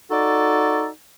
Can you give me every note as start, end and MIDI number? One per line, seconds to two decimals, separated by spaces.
0.11 0.88 63
0.11 0.88 66
0.11 0.88 69
0.11 0.88 74